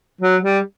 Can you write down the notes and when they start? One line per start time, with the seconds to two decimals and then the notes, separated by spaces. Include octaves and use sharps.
0.21 F#3
0.43 G3